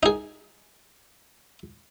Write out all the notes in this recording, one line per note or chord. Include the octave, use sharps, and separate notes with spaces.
D#4 G#4